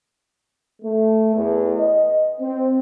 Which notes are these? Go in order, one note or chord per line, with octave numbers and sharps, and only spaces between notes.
A3
E2
D#5
C4